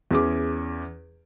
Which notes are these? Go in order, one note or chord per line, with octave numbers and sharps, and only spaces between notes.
E2 C#4 G#4 D6